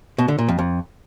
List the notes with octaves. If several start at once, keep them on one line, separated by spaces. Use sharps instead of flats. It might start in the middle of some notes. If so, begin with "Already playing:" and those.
B2
D3
A#2
F2
F2